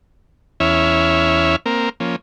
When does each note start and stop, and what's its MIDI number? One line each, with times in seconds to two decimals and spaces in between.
0.60 1.56 40
0.60 1.56 61
0.60 1.56 64
0.60 1.56 73
0.60 1.56 76
0.60 1.56 89
1.66 1.89 58
1.66 1.89 60
1.66 1.89 70
2.00 2.16 53
2.00 2.16 58
2.00 2.16 61